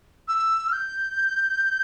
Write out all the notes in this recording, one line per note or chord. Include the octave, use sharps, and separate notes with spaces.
E6
F6
G6